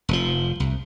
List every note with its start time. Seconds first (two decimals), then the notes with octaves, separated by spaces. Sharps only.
0.09 F1 G#2 F3
0.60 C2